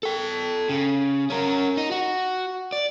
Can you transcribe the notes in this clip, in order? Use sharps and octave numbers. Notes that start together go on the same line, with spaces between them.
A4 G5
C#3
C#4 A#4
D#4
F#4
D5